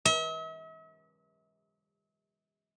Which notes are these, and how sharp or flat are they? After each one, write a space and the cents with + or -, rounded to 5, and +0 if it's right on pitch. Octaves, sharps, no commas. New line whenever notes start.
E5 -45